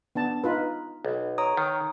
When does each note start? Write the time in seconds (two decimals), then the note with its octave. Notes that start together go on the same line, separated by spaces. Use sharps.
0.15 B3 D4 A5
0.44 D#4 F4 B4
1.05 B1
1.38 C#5 A#5 D#6
1.57 D#3